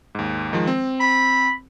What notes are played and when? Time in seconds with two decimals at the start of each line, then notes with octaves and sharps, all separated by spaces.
0.15 D#2 G#2
0.53 D#3 F3 G#3
0.67 C4
1.00 B5